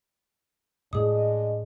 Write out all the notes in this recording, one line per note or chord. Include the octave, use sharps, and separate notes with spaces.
A2 G#3 A3 D4 G#4 D#5 D#6